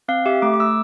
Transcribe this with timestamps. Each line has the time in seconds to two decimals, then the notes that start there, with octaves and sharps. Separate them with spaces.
0.08 C4 F5
0.26 G4 E5
0.42 A3 D6
0.54 D6
0.60 A3 E6